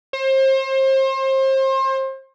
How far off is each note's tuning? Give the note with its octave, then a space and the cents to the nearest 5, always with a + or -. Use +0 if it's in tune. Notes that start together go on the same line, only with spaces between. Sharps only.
C5 +30